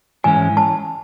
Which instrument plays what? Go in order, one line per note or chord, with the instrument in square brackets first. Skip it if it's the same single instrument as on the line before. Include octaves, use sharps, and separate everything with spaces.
[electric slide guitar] G#2 E3 G#3 C#4 [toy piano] G#5
[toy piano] A5